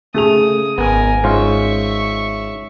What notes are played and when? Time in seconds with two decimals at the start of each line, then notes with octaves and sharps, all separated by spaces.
0.14 C#3 A3 G#4 D#6 F7
0.78 G#1 B3 A#4 G#5
1.24 G#2 C#4 F4 E5 C#6